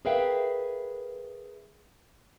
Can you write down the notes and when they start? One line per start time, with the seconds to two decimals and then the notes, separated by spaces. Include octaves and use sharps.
0.05 G#4 A#4 B4 E5 F5 G5